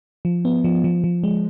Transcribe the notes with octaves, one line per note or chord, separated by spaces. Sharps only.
F3
B3
F3
F3
F3
G#3